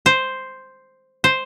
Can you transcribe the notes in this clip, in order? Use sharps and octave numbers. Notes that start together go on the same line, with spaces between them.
C5
C5